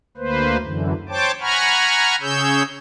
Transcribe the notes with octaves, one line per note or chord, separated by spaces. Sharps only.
D2 A#3 B4 C5
F#2 D3 E3
C5 C#5 G5 A5 D6
F#5 G#5 A#5 B5 C#6 F6
C#3 C#4 G#4 C#5 E6 G6